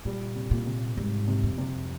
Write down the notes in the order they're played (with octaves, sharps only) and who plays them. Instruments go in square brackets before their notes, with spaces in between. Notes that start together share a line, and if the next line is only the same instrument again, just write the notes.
[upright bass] A#2 [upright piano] G3
[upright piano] C3
[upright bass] A#2
[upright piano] C3
[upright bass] G#2 [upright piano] G3
[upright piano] C3
[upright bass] F2
[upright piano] C3